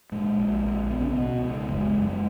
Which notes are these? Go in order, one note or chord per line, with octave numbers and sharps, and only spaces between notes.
A#2 G#3
A#1
A#1
C#2 B3
C#4
B3
B2
C#2
F#1 G#3
F#2
G#3